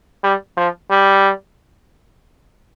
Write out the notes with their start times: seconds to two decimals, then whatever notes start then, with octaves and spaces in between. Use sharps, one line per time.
0.24 G3
0.57 F3
0.90 G3